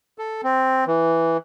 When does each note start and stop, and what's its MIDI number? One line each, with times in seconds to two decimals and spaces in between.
0.18 0.41 69
0.43 0.85 60
0.87 1.37 52